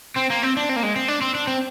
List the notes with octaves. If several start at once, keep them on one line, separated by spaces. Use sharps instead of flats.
C4
A#3
C4
D4
C4
A#3
G#3
C4
D4
C4
D4
C4